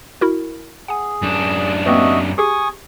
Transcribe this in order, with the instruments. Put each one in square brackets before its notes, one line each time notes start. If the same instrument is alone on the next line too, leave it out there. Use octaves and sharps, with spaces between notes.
[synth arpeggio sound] E4 F#4 A#4
[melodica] G#4 [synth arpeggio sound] F#5 G#5
[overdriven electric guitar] F#2 D4
[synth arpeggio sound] A#3 C4 B4 [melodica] F#4 D#5 E5
[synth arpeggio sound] G4 G#4 [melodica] G#5 C#6 D#6